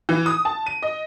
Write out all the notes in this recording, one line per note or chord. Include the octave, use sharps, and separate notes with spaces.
E3
D#6
A5
D#7
D#5